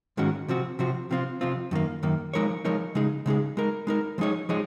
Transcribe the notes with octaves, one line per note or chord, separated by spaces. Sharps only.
G#2 D#3 G#3 C#4 F#4
C3 F3 C4 F#4
C3 F3 C4 F#4
C3 F3 C4 F4
C3 F3 C4 F4
F#2 D#3 A#3
F#2 D#3 A#3
F3 G#3 D#4 A#4 C#5
F3 G#3 D#4 A#4 C#5
C#3 G#3 D#4 G#4
C#3 G#3 D#4 G#4
G#3 D#4 A#4
G#3 D#4 A#4
F3 G#3 D#4 G#4 C#5
F3 G#3 D#4 G#4 C#5